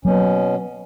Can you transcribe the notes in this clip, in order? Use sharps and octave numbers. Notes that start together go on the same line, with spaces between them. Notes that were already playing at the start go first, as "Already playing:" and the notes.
B2 F#3 A#3 C#4